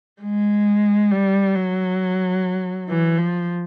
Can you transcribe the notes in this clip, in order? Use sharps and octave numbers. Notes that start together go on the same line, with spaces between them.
G#3
G3
F#3
E3
F3